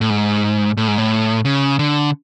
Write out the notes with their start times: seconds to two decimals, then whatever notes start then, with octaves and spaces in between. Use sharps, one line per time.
0.01 A2
0.10 G#2
0.77 A2
0.88 G#2
0.98 A2
1.45 C#3
1.79 D3